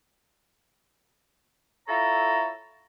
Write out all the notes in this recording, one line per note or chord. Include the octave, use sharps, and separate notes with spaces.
E4 F4 A4 C#5 A#5